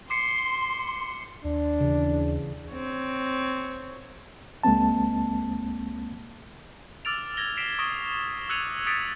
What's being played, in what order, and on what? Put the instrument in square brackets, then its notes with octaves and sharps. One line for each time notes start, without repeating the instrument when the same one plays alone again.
[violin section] C6 [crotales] D6 C7 C#7
[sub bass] D#2 [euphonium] D4
[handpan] C#3 E3
[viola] C4 C#5
[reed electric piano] C#2 G#3 A#3 C4 A5
[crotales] D6 E6 F6 A6 D7 F7
G#6 A#6 G7
B6 C7 D7 E7
C#6 D#6 A#6 D7 E7 G7
E6 F#6 G#6 C#7 D#7 F7
D#6 A6 B6 C#7 D7